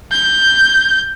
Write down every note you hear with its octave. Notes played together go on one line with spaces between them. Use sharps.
G6